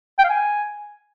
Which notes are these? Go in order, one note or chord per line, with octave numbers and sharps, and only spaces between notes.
G5
F5
G#5